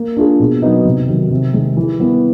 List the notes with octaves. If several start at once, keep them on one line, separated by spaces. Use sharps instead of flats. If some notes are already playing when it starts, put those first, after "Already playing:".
Already playing: A#3
D4 F4 G#4
B2
F#3 B3 D#4
C3
D#3 F#3
C3
D#3 G#3
E3
G3 B3 E4